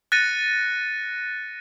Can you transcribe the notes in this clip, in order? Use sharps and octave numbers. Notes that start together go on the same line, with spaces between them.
F#6 A6 A#6 C#7 D#7